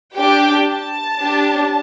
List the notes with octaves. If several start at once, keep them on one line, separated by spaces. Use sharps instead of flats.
D4 G4 G5
A5
D4 G4